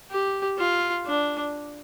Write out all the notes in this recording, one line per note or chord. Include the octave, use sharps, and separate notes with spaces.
G4
F4
D4